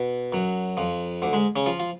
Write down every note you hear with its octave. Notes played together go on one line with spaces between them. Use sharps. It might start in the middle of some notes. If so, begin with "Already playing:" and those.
Already playing: B2
F#2 F#3
F2 F3
D2 D3
G#2 G#3
C#3 C#4
F3 F4
F4